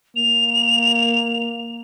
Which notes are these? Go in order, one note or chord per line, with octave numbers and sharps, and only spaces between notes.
A#3 F7